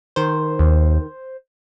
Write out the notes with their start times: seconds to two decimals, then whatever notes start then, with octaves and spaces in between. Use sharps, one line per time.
0.16 D#3 C5
0.59 D#2